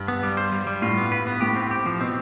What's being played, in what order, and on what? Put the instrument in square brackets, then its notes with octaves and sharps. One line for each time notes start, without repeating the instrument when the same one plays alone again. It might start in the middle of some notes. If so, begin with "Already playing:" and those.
Already playing: [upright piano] G2
[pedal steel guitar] B3
G3
C5
G3
G3
[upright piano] A2 [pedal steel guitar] F4
[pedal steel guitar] B3
B4
B3
[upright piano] A2 [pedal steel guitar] G4
[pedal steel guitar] C4
G4
F3
[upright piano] B2 [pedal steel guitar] C4